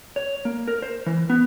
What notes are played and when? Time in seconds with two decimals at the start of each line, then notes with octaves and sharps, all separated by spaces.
0.16 C#5
0.45 A#3
0.68 A#4
0.82 C5
1.06 E3
1.30 B3